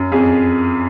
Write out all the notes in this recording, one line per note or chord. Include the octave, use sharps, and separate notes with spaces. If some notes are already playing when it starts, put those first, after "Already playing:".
Already playing: F#2
F2 G#4